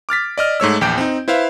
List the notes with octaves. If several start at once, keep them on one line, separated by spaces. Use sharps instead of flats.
D6 F6 A6 B6
D5 D#5 F6
G#2 A3 C#5 E6
A#1 E2 G5 D6 G6 D7
C4 D#4
E4 B4 C5 E5 F5